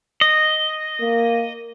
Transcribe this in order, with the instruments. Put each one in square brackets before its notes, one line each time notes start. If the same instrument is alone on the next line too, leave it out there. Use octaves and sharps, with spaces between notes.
[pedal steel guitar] D#5
[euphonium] A#3